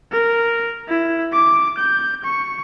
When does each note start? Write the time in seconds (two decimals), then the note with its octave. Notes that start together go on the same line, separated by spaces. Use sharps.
0.12 A#4
0.89 E4
1.33 D6
1.78 G6
2.24 C#6